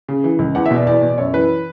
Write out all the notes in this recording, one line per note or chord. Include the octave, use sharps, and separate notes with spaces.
C#3
E3
C#2
E2 F#5
E5
B2 D5
E2 D5
B2
F#2 C#5
E3 B4